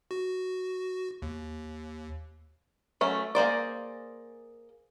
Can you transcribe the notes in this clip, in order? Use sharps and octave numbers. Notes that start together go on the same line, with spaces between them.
F#4
D#2
F#3 A3 C#4
A#3 G#4 C5 D5